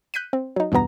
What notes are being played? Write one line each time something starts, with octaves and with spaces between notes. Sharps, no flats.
F#6 G6 B6 C#7 D#7
C4
F#3 D#4
E2 G2 B2 B3 A#5